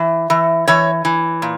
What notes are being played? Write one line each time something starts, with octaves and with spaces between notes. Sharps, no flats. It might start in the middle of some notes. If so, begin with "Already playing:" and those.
Already playing: E3
E3
E3 C#5
E3
A#2